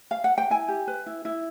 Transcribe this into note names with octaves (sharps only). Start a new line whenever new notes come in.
F5
F#5
G5
E4 G#5
G4
B4
E4
E4